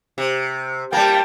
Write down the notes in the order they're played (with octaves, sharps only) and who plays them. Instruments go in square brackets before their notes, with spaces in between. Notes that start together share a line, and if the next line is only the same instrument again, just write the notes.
[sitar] C3
[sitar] G3 A#3 [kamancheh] G5 A5